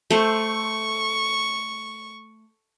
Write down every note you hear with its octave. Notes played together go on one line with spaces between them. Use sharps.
A3 C5 C#6